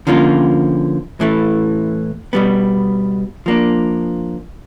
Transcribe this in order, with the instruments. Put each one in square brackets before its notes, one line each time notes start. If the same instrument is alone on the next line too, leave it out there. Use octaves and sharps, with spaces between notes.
[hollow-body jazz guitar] D3 F3 A#3 C#4 F4
A2 E3 A3
B2 G3 B3
F3 A#3 D4